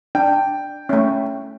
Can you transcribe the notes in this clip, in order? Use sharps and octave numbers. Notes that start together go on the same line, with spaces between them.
D4 G5
A3 C#4